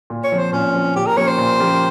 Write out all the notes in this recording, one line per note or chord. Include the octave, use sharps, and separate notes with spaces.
A#2
C#5
F3 C4
C5
A#2 C#4
F3 C4
A#2 G4
A#4
F3 A#3 C#4 G4 C#5
C5
A#2
F3 A#3 C#4 G4